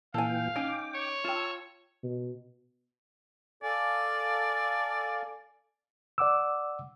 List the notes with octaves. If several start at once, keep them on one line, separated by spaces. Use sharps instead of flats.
A#2 E3 A4 F5 G5 G#5
C#4 D#4 G5 D6
C#5
F4 G5 A5 E6
B2
A4 D5 F5 G#5
D5 F#5 D6 E6